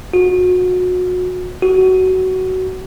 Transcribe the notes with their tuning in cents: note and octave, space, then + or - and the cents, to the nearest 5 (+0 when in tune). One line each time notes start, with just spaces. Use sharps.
F#4 -30
F#4 +15